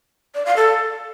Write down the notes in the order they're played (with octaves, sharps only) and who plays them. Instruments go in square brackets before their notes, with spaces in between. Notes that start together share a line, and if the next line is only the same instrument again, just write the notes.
[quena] D5
F5
A4